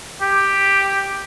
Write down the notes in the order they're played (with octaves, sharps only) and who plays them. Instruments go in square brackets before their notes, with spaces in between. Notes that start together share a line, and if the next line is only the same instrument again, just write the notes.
[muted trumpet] G4